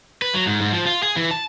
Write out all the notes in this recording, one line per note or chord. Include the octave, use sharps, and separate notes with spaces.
B4
F#3
G#2
G#2
F3
F4
G#4
E3
A5